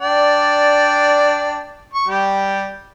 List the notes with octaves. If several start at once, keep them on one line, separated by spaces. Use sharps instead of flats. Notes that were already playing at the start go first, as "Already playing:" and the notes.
D4 D5 G5
C#6
G3 G4